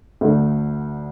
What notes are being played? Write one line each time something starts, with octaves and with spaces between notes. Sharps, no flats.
D2 D3 A3